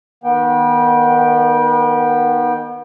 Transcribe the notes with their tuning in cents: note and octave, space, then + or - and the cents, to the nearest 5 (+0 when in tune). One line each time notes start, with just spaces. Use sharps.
D#3 -10 B3 -30 G5 +0